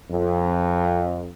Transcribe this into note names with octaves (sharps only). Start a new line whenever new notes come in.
F2